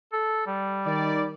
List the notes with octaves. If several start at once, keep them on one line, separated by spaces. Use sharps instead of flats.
A4
G3
D#3 D5